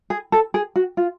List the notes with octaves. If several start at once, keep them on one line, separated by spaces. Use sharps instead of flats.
G#4
A4
G#4
F#4
F4